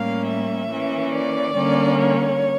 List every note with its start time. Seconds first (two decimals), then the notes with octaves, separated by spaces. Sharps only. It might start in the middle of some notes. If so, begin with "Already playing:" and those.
Already playing: A2 G3 A#3 C#4 F5
0.27 E5
0.71 E3 A#3 C#4
1.14 D5
1.57 D3 G3 A#3 C#4
1.99 C#5